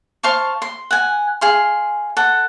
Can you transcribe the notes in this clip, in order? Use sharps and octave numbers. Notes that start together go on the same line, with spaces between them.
C5 F5 A5 C#6
C6
F#5 G#5
G#4 F5 C6
A4 F#5